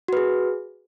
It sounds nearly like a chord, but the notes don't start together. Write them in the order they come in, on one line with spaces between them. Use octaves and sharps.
F#4 B4 G#4